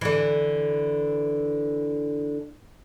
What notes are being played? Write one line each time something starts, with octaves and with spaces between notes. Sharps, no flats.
D3 E3